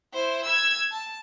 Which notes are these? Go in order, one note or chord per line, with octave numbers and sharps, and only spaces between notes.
E4 C5
E6 G#6
A5